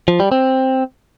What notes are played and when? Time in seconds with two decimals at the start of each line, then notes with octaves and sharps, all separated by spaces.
0.08 F3
0.20 G3
0.32 C4